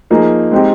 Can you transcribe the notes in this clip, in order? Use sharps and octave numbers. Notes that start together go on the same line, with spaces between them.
F3 A#3 D#4 G#4
G#3 C4 D#4 G4